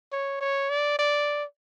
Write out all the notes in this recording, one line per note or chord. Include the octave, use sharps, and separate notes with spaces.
C#5
C#5
D5
D5